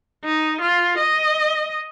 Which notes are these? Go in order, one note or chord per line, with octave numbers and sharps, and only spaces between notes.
D#4
F4
D#5